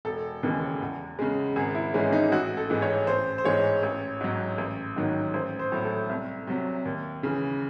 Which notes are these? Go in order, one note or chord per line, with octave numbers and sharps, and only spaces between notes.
E1 A4
D#2 C#3 E3 G#3
E2
C#3 G#3
G#1 G#4
E4
G#2 E3 G#3 C#4
D#4
A1 F#4
A4
G#2 E3 G#3
C#5
A1 C5
C5
G#2 E3 G#3 C#5
A1
G#2 F#3
A1
G#2 D#3 F#3
A1 C5
C5
A2 F#3
A4
C2
C3 F#3
D#2
C#3 E3